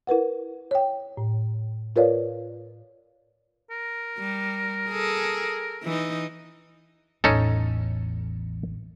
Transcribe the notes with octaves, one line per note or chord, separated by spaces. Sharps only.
E4 A#4 B4 F#5
C#5 G5
A2
F4 A#4 B4 C#5 D5 F5
A#4
G3
G#4 A4
E3 D#4
A1 E2 C#4 D#4 A4